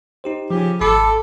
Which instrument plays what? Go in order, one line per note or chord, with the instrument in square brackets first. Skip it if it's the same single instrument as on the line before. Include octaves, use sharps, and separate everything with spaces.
[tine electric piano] D#4 G4 C5
[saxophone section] C#3 G4 [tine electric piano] F3
[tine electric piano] G#1 B5 D6 [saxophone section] A4